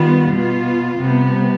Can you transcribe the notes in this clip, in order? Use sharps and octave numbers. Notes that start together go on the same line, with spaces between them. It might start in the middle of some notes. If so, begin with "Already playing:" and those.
Already playing: D#3 G3 B3 F4
B2 B3 F4
C3 G3 B3